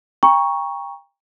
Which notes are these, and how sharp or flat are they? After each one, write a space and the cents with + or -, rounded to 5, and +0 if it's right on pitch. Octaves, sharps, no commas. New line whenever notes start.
G5 +30 A#5 +15 C#6 +0